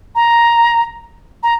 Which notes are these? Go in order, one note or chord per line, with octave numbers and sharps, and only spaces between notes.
A#5
A#5